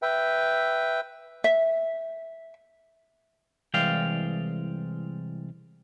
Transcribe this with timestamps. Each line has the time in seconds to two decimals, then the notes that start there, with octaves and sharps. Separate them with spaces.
0.02 B4 E5 G5
1.44 E5
3.74 C2 E3 G#3 D5 F5 G5